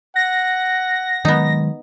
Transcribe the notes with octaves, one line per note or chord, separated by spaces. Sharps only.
F#5 A#6
D#3 F#3 G#3 B3 D#4